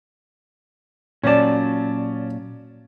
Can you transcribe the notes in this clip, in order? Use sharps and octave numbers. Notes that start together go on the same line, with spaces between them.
A#2 F#3 C#4 D5 A5